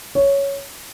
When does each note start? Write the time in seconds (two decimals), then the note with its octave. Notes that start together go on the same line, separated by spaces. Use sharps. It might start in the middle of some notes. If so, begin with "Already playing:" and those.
0.15 C#5